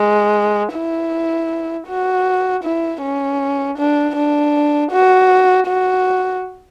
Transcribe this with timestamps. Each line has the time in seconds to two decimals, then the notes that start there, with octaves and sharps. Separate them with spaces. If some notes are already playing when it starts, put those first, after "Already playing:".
Already playing: G#3
0.74 E4
1.88 F#4
2.64 E4
3.03 C#4
3.78 D4
4.16 D4
4.92 F#4
5.67 F#4